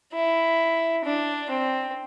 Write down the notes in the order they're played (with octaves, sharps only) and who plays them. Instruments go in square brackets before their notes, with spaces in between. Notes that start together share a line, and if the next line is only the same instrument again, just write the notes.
[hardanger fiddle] E4
D4
C4